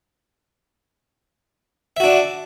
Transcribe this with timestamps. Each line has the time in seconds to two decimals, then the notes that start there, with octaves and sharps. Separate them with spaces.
1.97 E5
2.00 F#4
2.04 D4